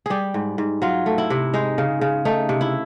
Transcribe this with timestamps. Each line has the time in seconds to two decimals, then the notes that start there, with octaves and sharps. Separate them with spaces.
0.06 G3 G4 G#4
0.34 G#2
0.58 G#2
0.82 F#3 F4
1.06 A3
1.18 E4
1.30 C3
1.54 G#3 D#4
1.78 C#3
2.01 C#3
2.25 A3 D#4
2.49 C3
2.61 E4